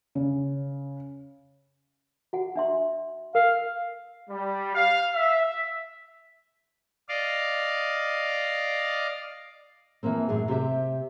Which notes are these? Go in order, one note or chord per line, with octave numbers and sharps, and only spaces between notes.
C#3
F#4 F#5
D4 E5 C6
A#4 F5
G3
F5
E5
D5 D#5 F5
E3 F3 A#3 C4
F#2 A2 D4 G#4 A#4
C3 G4 C5 E5